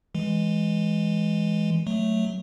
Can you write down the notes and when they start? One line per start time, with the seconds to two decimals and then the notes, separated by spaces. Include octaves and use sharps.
0.15 E3 G#3
1.87 F#3 A3